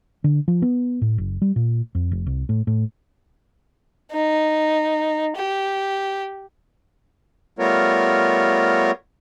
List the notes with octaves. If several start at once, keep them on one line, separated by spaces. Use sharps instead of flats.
D3
F3
B3
A2
F#1
G3
A#2
F2
F1
C2
A2
A2
D#4
G4
G3 A3 B3 F4 A#4 C#5